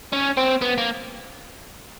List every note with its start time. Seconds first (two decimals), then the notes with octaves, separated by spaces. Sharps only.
0.13 C#4
0.37 C4
0.62 B3
0.78 A#3